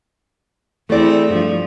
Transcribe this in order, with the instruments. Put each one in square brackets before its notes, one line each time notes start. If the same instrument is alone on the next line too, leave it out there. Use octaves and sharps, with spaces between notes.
[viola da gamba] E2 C4 [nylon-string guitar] A3 D5
[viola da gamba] G2 F3